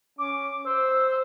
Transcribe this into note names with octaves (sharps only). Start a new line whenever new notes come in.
C#4 D6
C5 E6